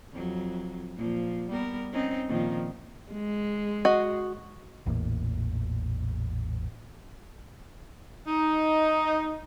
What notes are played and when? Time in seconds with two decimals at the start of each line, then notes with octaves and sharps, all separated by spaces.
0.13 F2 F#3
0.96 A#2 F3
1.49 G3 B3 A#4
1.93 C4 C#4 D#4
2.28 A#2 D#3 F3
3.12 G#3
3.85 F#4 D#5
4.86 A1 E2 A#2
8.27 D#4